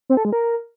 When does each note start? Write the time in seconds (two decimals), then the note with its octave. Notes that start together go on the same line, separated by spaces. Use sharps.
0.10 C4
0.17 A4
0.25 G#3
0.33 A#4